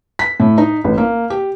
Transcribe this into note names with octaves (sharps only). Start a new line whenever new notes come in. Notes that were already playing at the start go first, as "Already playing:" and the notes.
B6
A2
D#4
A1
A#3
G4